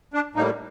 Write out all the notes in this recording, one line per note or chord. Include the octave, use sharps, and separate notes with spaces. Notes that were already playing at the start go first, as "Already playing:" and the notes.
D4
A2 G3 A#3 D#4